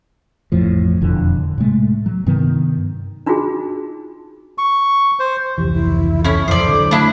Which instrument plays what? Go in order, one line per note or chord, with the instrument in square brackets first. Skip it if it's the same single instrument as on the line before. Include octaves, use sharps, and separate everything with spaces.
[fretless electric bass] A1 F2 A2 F3
E1 F2 D3
A2 C3 G#3 A3
F#3
G2 C3 D#3 B3
[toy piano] D4 D#4 F4 F#4 G#4
[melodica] C#6
C5
[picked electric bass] F1 C#2 E3 [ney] G4
[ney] E4
[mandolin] C#4 E4 [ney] A4
[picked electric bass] D#1 F2 E3 [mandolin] C5 D5
[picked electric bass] D3 F#3
[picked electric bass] A3 [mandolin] D4 E4 [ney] B5